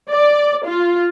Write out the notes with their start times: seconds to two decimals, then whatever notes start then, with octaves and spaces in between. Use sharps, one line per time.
0.10 D5
0.66 F4